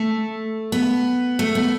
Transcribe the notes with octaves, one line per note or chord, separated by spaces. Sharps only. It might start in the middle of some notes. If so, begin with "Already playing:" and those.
Already playing: A3
B3
A3
B3